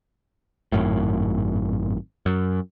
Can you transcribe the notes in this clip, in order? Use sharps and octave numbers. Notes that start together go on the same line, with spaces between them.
G#1 F#2 A2
F#2